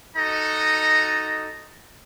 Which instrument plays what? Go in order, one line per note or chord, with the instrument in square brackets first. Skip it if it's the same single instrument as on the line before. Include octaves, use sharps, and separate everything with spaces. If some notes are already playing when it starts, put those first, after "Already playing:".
[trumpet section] D#4 F#4 A4 D#5 A#5